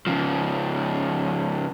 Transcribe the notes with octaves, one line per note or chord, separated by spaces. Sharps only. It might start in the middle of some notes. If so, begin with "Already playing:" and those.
C#3 F3